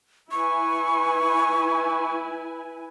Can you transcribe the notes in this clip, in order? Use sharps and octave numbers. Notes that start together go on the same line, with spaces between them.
E4 B4 G#5 C#6